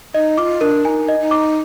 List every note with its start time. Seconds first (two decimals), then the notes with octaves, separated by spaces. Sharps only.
0.14 D#4 D#5
0.38 F4 D6
0.61 D4 A#4
0.85 D#4 G#5
1.09 D#5
1.20 D#4
1.31 D6